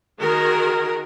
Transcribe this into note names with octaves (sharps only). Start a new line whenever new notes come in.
D#3 F#4 G#4 A#4